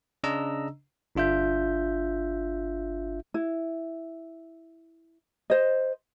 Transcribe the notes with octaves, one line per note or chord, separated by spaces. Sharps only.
C#3 D4 D#5 A#5 E6
G1 D4 F4 E5 G6
E4
C5 D#5